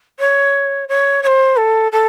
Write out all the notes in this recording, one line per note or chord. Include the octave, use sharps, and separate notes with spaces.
C#5
C#5
C#5
C5
A4
A4